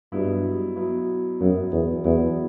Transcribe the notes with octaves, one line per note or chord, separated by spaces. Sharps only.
G2 B2 F#3 B3 E4
B2 F#3 B3 E4
F#2 B2 F#3 B3 E4
E2
E2 B2 F#3 B3 E4